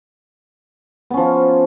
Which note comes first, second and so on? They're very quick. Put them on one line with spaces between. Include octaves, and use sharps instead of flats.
B3 C#4 F3 F4